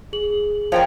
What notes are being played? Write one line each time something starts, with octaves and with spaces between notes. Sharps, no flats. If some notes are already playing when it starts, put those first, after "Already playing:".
G#4 F#7
F3 A#4 C#5 F5 G5 A#5